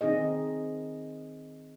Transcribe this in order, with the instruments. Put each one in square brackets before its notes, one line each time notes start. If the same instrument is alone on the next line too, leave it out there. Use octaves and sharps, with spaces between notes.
[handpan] D#3 C4 D#4 G#4 D#5